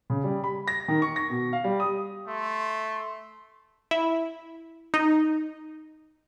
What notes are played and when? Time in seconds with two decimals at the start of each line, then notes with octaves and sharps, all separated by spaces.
0.10 C#3
0.24 G3
0.44 B5
0.68 A#6
0.88 D#3
1.02 C#6
1.16 A#6
1.30 B2
1.53 F5
1.64 G3
1.80 D#6
2.26 A3 C6
3.91 E4
4.94 D#4